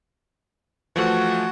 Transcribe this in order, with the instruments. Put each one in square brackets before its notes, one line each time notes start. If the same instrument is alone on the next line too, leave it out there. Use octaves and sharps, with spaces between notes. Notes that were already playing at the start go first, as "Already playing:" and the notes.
[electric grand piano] E3 F3 A3 [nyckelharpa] F#4